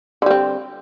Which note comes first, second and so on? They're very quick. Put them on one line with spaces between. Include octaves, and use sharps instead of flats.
D3 G3 C4